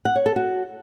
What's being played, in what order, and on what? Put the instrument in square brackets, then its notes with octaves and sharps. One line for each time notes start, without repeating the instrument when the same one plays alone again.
[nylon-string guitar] F#5
C#5
A4
F#4